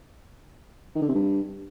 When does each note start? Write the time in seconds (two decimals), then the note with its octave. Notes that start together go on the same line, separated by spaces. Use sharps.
0.95 D#3
1.02 D3
1.08 C3
1.14 G2